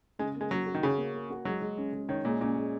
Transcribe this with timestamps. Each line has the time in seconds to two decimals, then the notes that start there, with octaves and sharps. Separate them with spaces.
0.19 C#3 G#3
0.36 G#3 A#3
0.51 F#3 F#4
0.66 F#4
0.75 D#3
0.83 C#3 C#5
0.98 A#3
1.14 A#3
1.30 F#4
1.45 F#3 G#3
1.61 G#3
1.78 C#4
1.93 G#3
2.09 D#3 C#5
2.25 A#2 G#3
2.41 A#2 C#4
2.56 G#3